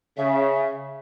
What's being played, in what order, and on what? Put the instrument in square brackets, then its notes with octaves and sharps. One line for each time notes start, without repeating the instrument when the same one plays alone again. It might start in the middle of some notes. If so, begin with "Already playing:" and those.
[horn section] C#3 [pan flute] E5